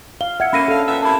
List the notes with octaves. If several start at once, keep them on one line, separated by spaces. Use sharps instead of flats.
F5 G7
E5 F#5 G#6 C#7
F#3 A3 A#3 C#4 B5 A#6 D#7
D3 A4 F5
A#2 B3 E5
C3 A#3 E4 A5 B5